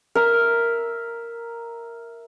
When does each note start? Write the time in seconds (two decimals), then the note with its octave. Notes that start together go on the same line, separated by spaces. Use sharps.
0.15 A#4 E5